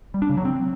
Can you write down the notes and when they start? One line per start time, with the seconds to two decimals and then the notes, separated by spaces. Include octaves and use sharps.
0.14 G3
0.22 D4
0.30 C#3
0.37 F#3
0.45 C4